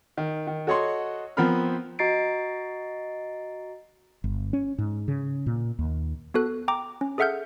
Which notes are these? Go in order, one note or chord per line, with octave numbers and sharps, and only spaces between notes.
D#3
D#3
F#4 A4 C#5 D#5 F#5 C6
F3 B3 C4 A#4 B5 F6
F#4 D#5 A#5 A6 C7 D7
G1
C#4
G#2
C#3
A#2
D#2
B3 F#4 A4 F#6
G5 A#5 D6
C#4
G#4 A4 E5 F#5 F6 G6